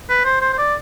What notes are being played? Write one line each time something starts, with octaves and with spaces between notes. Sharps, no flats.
B4
C5
C5
C5
D5